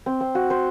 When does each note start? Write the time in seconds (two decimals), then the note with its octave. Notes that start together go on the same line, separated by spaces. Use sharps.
0.06 C4
0.21 C4
0.35 F#4
0.50 C5